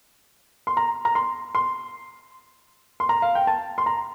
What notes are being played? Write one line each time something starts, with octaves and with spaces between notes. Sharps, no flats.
C6
A#5
A#5
C6
C6
C6
A#5
F5
G5
A5
C6
A#5